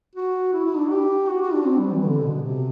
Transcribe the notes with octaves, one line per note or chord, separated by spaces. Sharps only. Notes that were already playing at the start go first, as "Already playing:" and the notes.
F#4
E4
E4
D4
G4
F#4
F#4
D4
C4
G3
E3
D3
B2
C3